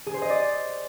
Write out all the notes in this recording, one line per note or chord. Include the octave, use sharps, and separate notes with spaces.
G#4
C5
D#5
D5